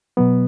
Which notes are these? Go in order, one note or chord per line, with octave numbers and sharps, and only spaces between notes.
B2 F#3 B3